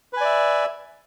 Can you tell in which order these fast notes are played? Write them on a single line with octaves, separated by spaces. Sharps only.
B4 G#5 D5 E5